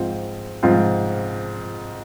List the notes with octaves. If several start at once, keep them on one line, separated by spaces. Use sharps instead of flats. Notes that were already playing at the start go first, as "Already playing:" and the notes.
Already playing: G#2 F3 C4 F4
G#2 F3 C4 F4